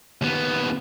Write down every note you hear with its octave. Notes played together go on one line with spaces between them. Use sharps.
D#2 B3